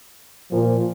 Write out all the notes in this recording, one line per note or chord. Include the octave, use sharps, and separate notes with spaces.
A#2 F3